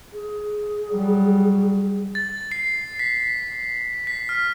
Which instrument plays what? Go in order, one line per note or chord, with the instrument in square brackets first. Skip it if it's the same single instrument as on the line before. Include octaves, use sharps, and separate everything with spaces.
[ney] G#4
[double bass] F#3 G3
[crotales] A6
C7
B6
B6
F6